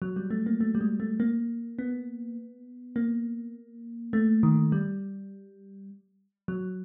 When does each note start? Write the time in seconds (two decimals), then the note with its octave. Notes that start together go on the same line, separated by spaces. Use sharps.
0.02 F#3
0.16 G3
0.30 A3
0.46 A#3
0.60 A3
0.75 G3
0.81 G#3
1.00 A3
1.20 A#3
1.79 B3
2.96 A#3
4.13 A3
4.43 D#3
4.72 G3
6.48 F#3